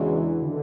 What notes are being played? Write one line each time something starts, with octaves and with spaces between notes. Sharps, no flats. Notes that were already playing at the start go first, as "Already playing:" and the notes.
Already playing: E2 C#3 E3 G#3 D4 F#4
D3